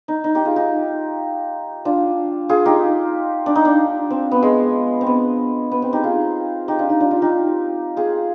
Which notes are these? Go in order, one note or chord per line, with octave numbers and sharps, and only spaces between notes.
D#4
D#4
D#4 G4
F4 G#4
D#4 G4
D4 F4
F4 G#4
D#4 G4
D4
D#4
D4
C4
B3
G#3
C4
B3
B3
C4
D#4 G4
F4 G#4
D#4 G4
D4 F4
D#4 G4
D4 F4
D4 F4
D#4 G4
F4 G#4